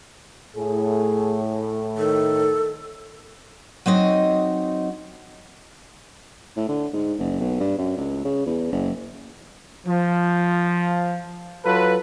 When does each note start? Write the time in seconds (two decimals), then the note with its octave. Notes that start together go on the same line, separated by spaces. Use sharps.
0.56 A2 G#4
1.97 D#3 A4
3.86 F#3 C4 D#4 D#5
6.56 A2
6.69 D3
6.94 G#2
7.19 F#1
7.40 B1
7.60 G2
7.78 F#2
7.97 C#2
8.25 C#3
8.46 E2
8.72 F#1
9.87 F3
11.65 F#3 F4 A4 B4